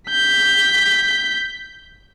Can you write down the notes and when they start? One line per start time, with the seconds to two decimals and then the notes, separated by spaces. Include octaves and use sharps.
0.10 G6 B6